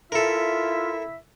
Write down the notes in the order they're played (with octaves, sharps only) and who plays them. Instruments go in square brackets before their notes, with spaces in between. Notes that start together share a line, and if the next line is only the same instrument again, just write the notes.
[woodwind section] E4 E5 [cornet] F4 [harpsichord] A4 A#4